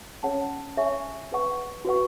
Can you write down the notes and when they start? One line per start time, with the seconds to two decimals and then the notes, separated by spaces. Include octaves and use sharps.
0.23 C#4 G#4 C#5 F#5 A5
0.77 G#4 C#5 E5 G#5 C#6
1.32 G#4 B4 F#5 C#6
1.85 F#4 B4 F#5 C#6